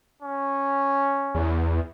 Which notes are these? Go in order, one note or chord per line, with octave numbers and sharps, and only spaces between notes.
C#4
E2